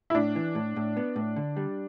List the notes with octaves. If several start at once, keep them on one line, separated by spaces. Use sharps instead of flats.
E4
A2 D4
E3
A2
A2
B3
A2
D3
G3